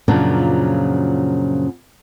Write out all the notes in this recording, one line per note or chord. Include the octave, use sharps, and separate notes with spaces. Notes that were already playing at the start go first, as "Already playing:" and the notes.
F#2 A#2 C#3 F3 F#3 D4